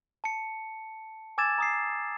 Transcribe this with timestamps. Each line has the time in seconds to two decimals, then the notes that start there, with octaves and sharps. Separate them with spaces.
0.24 A5 C#7
1.38 G#5 D6 E6 G#6 A6 E7
1.58 A#5 D#6 C7